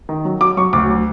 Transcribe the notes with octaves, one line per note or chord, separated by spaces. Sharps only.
D#3
F#3
F#3 D6
F#3 C#6
D2 D6
F#3